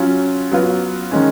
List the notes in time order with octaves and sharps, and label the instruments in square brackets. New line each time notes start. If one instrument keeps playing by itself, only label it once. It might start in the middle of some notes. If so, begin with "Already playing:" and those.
Already playing: [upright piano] F#3 C#4 F4
F#3 B3 F4
D#3 G#3 C#4